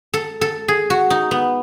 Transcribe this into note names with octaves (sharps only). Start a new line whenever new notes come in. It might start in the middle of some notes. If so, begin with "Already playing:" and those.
A4
A4
G#4
F#4
D#4
B3